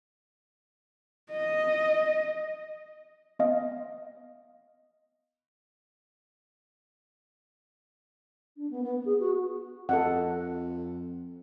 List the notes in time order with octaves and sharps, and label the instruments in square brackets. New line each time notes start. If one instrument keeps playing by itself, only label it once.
[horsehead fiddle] D#5
[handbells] B3 D#5 F5
[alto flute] D4
B3
B3
G#4
F#4
[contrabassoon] F2 [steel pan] A4 D#5 F#5